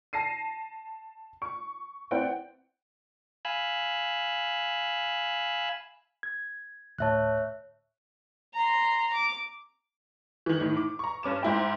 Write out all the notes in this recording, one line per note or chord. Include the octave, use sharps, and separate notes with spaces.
A5 A#6 C7 D#7
C#6
C4 E4 B4 D5 F#5 G5
F5 G#5 B5 E6 F#6
G#6
D2 A2 C#5 E5 A5 F#6
A#5 C6
D6
D#3 E3
A2 D#3
D6
A#5 C#6
G2 C#4 D6 E7
G#2 E4 G5